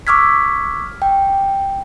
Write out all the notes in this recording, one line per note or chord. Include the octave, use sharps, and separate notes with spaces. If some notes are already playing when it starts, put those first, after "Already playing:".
C#6 D6 E6 F6 G#6 B6
G5